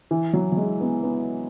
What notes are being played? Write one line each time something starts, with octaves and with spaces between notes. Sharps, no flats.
E3
F#3
F#3
G#3
B3
B3